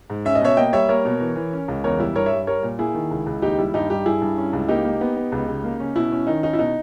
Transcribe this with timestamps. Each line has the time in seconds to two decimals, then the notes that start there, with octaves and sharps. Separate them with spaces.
0.10 G#2
0.25 C#4 E5
0.35 D#5
0.41 B2 C#5 E5
0.57 A#3 D#5 G5
0.73 G3 C#5 E5
0.89 A#3 A#4 C#5
1.05 B2
1.20 E3
1.36 E3
1.53 C#4
1.68 C#2
1.84 E2 A#4 C#5
1.99 G3 E4
2.15 G2 A#4 C#5
2.26 C#5 E5
2.32 G3
2.47 G3 A#4 C#5
2.63 A#2
2.79 A#3 E4 G#4
2.95 D#3
3.11 C#2
3.26 C#2
3.42 D#2 D#4 G4
3.58 G3 E4
3.74 G2 D#4 G4
3.90 G3 D#4 G4
4.06 G2 E4 G#4
4.22 G2
4.37 C#4
4.53 C#2
4.68 A#3 D#4 G4
4.85 A#3
5.01 B3
5.16 B3
5.32 C#2
5.48 C#3
5.64 A#3
5.80 C#4
5.96 B2 E4
6.12 C#4
6.27 D#3 D#4
6.43 C#4 D#4
6.53 E4
6.59 B2 D#4